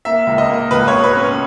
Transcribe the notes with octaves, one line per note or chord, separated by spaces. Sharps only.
A#3 E5
C#2
D#5
A#3
C#2 B4
C#5
B2
B4
C#4